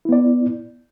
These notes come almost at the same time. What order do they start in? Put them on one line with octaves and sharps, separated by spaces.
E4 B3 D5